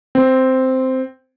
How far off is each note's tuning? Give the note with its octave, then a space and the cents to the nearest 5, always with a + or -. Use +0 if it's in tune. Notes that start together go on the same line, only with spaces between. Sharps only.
C4 -5